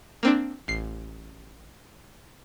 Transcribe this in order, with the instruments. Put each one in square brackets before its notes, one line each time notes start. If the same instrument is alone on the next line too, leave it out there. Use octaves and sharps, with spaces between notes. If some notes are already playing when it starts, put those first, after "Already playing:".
[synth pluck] A#3 C4 D4
A1 C7